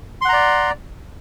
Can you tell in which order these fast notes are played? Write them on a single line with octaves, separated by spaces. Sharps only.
C6 F#5 A#5 D5